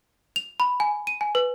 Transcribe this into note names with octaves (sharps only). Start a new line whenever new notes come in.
F7
B5
G#5
D#7
G#5
B4